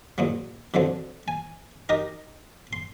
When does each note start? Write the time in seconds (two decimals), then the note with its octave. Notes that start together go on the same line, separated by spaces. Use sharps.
0.18 E2 A#2 F#3
0.74 B2 D3 F3 F#3 C4
1.28 G#5
1.89 D#4 G4 A#4 D#5
2.73 C6